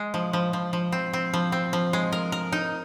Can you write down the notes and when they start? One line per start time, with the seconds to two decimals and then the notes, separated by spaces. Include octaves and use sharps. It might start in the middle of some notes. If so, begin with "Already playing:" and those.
Already playing: G#3
0.14 F3
0.33 F3
0.53 F3
0.73 F3
0.92 C4
1.13 C4
1.34 F3
1.52 C4
1.73 F3
1.93 G#3
2.12 A#4
2.32 A#4
2.52 D#4